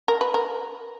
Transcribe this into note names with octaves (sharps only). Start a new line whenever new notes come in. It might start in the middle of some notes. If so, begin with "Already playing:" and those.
A#4
B4
A#4